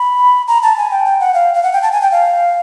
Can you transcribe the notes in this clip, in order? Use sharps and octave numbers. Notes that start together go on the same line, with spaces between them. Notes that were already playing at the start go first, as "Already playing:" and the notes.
Already playing: B5
A#5
A5
G#5
G5
G5
F#5
F5
F5
F#5
G5
A5
G#5
G5
F5